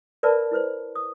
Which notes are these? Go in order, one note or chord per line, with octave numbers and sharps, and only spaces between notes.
A#4 B4 D5 E5 A5 B5
E4 B4 C5
D#6